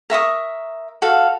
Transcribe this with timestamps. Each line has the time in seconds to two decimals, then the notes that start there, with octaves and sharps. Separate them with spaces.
0.10 A#4 E5 C#6 D#6
1.02 F#4 A4 F5